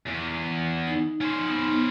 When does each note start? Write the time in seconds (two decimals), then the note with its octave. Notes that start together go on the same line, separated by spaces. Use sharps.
0.06 E2
0.87 D#4
1.21 C#4 C5
1.48 B3 D#4